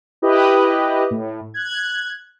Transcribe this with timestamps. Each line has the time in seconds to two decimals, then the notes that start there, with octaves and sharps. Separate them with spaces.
0.22 E4 G4 B4 D#5
1.11 A2
1.54 F#6 G#6